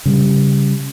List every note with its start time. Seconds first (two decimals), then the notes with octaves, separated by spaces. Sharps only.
0.06 C#3 G3